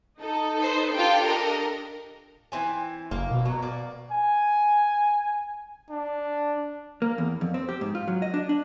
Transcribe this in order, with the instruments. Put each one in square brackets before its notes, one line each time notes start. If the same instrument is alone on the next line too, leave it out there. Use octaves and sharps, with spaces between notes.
[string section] D#4 A4
[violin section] B4 C5
[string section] D4 G4 A4 [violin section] F4 G5
[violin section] A#4 D#5
[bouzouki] E3 C4 G#5
[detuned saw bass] F#1 [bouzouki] A#3
[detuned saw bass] B2
[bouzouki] F#3
A#3 D5
[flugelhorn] G#5
D4
[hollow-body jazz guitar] A#3
E2
F2
C4
G4
G#2
F4
F#3
D#5
D4
D4